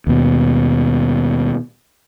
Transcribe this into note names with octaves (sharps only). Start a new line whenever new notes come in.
D#2 B2